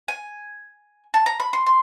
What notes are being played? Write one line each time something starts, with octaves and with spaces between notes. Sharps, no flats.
G#5
A5
A#5
B5
C6
C6